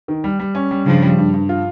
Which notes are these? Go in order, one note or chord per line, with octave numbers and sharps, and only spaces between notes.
D#3
G3
G3
C#4
G3
G2 C#3 F3
G3
G2
G2
F4